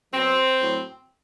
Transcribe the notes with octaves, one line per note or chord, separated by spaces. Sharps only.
B2 F#3 C4
A2 F#3